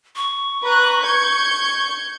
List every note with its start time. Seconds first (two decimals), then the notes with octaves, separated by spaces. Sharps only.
0.16 C#6
0.63 B4 A#5 F#6
1.03 G6 G#6 C#7